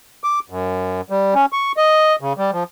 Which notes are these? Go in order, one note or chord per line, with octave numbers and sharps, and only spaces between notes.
D6
F#2
G3
C#4
C#6
D#5
C#3
G3
F3